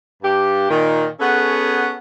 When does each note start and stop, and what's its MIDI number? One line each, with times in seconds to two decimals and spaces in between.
0.23 0.67 43
0.23 0.67 67
0.70 1.08 46
0.70 1.08 51
1.20 1.96 59
1.20 1.96 61
1.20 1.96 66
1.20 1.96 68
1.20 1.96 69